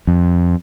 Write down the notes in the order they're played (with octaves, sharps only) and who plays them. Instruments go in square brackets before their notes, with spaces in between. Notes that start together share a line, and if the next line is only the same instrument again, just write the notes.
[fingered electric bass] F2